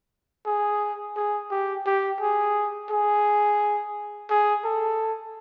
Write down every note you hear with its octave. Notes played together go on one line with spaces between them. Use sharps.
G#4
G#4
G4
G4
G#4
G#4
G#4
A4